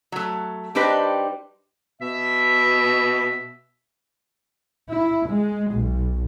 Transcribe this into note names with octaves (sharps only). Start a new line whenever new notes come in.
F#3 A3
G3 D4 D#4 G4 B4 C5
B2 E5
E4
G#3
B1